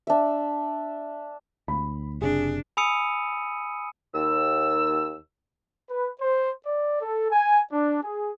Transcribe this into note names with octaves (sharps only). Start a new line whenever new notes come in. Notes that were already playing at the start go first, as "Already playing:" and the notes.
D4 E5
D2 B5
F#1 C3 D4 G#4
G#5 B5 D#6 E6 C#7 D#7
D#2 E6
B4
C5
D5
A4
G#5
D4
G#4